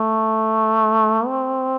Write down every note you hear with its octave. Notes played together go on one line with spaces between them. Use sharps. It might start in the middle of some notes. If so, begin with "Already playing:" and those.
Already playing: A3
C4